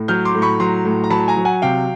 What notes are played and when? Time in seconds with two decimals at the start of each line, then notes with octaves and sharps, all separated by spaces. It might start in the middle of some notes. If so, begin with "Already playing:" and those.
Already playing: A2
0.08 F#3 F6 G6
0.25 C6 D6
0.35 A2
0.42 B5 C#6
0.60 F#3 A#5 C6
0.85 A2
1.04 A#5
1.10 F#3 A5 B5
1.28 G#5 A#5
1.37 F#3
1.45 F#5 G#5
1.62 C3 F5 G5